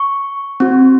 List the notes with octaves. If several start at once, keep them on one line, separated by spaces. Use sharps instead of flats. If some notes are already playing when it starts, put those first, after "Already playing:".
Already playing: C#6
C4 F#4